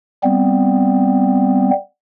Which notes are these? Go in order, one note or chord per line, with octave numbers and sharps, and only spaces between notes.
G3 B3 C4